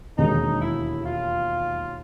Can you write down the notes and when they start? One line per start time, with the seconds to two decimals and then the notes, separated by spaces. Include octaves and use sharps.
0.18 E1 D#2 D#3 G#3 D#4
0.62 E4
1.05 F4